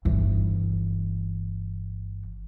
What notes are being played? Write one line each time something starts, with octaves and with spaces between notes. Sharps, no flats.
G1 E3